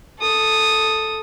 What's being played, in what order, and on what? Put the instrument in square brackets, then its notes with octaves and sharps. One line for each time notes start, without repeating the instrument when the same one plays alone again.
[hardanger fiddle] A4 D#6